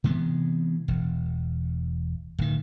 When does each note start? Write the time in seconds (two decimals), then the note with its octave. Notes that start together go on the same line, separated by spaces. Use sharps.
0.04 C3 E3 G#3 B3
0.88 E1
2.38 D1 D#3